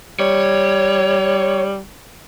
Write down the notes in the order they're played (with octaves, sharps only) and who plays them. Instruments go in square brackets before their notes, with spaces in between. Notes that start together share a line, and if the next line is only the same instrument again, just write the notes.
[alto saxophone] G3 [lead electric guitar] C#5